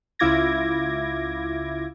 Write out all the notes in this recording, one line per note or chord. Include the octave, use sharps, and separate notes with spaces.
C#2 E4 F4 D6 G#6 A#6